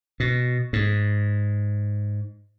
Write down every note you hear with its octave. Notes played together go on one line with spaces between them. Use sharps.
B2
G#2